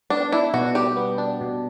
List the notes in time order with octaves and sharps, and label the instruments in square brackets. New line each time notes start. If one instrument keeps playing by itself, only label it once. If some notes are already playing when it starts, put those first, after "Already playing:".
[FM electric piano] B3 [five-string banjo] D4
[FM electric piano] D4 [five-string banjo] E4
[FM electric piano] B2 [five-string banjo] F#4
[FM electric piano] G3 [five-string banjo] G4
[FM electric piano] B3
D4
B2